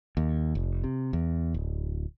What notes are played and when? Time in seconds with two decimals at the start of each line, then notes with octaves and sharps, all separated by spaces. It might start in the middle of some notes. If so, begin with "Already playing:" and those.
0.17 D#2
0.55 F1
0.84 C3
1.13 E2
1.54 D1